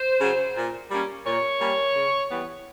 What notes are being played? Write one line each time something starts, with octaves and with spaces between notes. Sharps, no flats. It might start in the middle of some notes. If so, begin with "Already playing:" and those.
Already playing: C5
C#3 F#3
A#2
G3 A#3 C#4
A#2 C#5
G3 A#3 C#4
C#3
E3 G3 B3